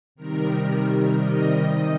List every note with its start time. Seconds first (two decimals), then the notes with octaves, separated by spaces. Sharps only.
0.15 C3 D#3 G3 A#4
0.85 A#4
1.20 D#5
1.55 C3 D#3 G3